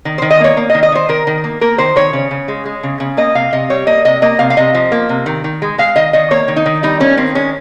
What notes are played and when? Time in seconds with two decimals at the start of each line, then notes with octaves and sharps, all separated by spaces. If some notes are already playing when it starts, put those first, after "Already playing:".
0.05 D#3
0.18 D#3 C5
0.30 D#5
0.40 A#3 C#5
0.57 A#3
0.70 D#5
0.74 D#3
0.83 D#5
0.92 D#3 C5
1.09 D#3 A#4
1.27 D#3
1.44 A#3
1.61 A#3 A#4
1.78 D#3 C5
1.96 D#3 C#5
2.13 C#3
2.31 C#3
2.48 G#3
2.65 G#3
2.83 C#3
3.00 C#3
3.17 A#3 D#5
3.35 C3 F5
3.53 C3 D#5
3.70 G3 C#5
3.87 A#3 D#5
4.05 C3 D#5
4.22 A#3 D#5
4.39 C3 F5
4.50 F5
4.57 C3 D#5
4.74 F3
4.92 A#3
5.09 C3
5.26 D#3
5.44 D#3
5.62 G#3
5.78 G#3 F5
5.96 D#3 D#5
6.13 D#3 D#5
6.31 A#3 C#5
6.48 D#3
6.56 D#4
6.66 D#3
6.83 G3 D#4
7.00 A#3 C#4
7.17 D#3 C4
7.35 G#3 C#4